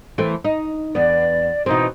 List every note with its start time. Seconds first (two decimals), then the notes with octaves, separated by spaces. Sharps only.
0.18 E3 A3 C4
0.44 D#4
0.95 E2 B3 D5
1.66 B2 E3 C4 D#4